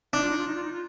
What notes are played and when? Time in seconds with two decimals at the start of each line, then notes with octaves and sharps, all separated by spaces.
0.13 D4 D#4
0.21 F4
0.30 D#4
0.38 F4
0.47 D#4
0.55 F4
0.64 D#4
0.72 F4